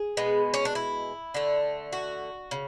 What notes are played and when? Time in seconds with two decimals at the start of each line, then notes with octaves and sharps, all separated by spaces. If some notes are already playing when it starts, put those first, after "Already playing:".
Already playing: G#4
0.17 B2 G#3 B3
0.54 C#4
0.65 D4
0.75 E4
1.34 D3 A3
1.93 F#4
2.51 C#3